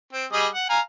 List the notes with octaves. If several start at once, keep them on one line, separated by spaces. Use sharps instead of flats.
C4
G3 G#4 D#5
F#5
F5 G#5 A#5